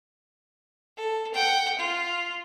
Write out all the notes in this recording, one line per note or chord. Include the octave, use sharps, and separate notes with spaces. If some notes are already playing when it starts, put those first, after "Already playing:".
A4
F#5 G5
F4